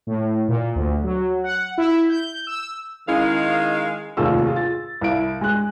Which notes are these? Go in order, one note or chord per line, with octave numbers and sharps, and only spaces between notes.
A2
A#2
D2
F#3
F#5
E4
G6
E6
D#3 G#3 C#4 E4 G#4 F5
F1 D#2 C3 F4 G#4 E6
F4 G#4
A6
C2 E4 F5 D7
G#3 F#6